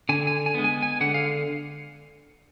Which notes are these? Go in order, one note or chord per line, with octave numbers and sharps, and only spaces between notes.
D3 G#5
G#5
G#5
G#3 B3
G#5
G#5
D3 F#5
F5